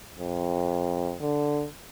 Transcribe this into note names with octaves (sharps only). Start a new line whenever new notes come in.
F2
D3